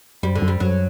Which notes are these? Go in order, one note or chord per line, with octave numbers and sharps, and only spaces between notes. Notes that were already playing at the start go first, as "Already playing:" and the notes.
F#2 G3
D3
F#2
G3
F#2 F#3